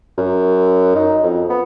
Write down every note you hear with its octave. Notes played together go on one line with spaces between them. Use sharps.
F#2
D#4
F2
B3